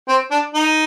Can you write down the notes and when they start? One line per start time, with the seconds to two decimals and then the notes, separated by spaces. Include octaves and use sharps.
0.08 C4
0.30 D4
0.54 D#4